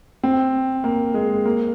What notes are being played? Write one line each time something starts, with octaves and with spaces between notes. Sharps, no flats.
C4
A#3
G#3
A#3